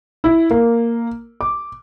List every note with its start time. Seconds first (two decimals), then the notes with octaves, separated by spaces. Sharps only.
0.24 E4
0.51 A#3
1.41 D6